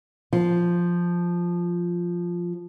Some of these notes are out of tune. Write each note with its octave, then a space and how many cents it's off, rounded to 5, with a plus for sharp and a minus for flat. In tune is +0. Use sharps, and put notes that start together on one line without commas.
F3 +0 F4 +0